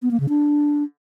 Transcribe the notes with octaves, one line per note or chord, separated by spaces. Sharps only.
B3
A#3
C#3
D4